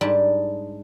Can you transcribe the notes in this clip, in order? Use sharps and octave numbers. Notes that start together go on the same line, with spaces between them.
G#2 G3 D4 A5